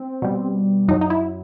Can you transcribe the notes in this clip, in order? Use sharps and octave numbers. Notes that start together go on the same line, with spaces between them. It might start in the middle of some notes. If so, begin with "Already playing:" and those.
Already playing: C4
B2 G3
F#2 F#3 D#4
D#4
E4